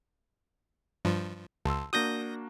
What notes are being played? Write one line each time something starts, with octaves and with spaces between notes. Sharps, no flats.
G2 F3
C#2 A5 C6 E6
A#3 D4 F#4 D#6 G6 A#6